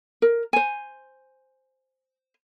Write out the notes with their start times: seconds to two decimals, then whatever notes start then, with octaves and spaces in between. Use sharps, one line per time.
0.22 A#4
0.53 C5 G#5